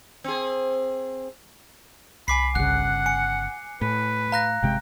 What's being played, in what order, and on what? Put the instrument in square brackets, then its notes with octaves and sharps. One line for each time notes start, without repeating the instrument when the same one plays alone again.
[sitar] C4 G#4
[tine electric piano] C2 [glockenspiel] G#5 D6 C7 [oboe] B5
[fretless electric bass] G1 C#3 [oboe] F#5 [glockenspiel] F#6
[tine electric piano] G#5 [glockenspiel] C#7
[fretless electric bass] A2 [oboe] B4
[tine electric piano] F5 [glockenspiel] A#5 F#6 A#6
[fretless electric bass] G1 C3 G#3 [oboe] G5